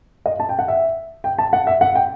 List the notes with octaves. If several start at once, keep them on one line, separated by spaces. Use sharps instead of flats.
D#5
A5
G5
F#5
E5
G5
A5
F#5
E5
F#5
G5